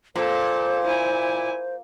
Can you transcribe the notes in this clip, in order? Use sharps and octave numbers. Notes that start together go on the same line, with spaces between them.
A#2 A4 C5
E4 G#5